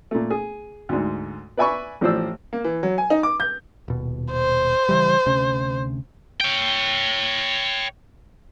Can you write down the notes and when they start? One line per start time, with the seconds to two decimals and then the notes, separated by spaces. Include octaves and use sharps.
0.11 A#2 A3
0.30 G#4
0.89 D2 G#2
1.57 B4 D5 E5 G#5 B5 C#6
2.01 A1 A2 F3 C5 D5 E6
2.53 A#3
2.64 E3
2.83 F#3
2.98 G#5
3.10 D#4
3.23 D6
3.40 G6
3.88 D#1 B2
4.32 C5
4.89 C#3 E3 G3
5.26 D2 C3 C#4
6.40 C#5 G5